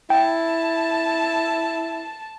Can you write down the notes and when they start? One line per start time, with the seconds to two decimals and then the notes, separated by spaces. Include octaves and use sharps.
0.10 E4 G5 A5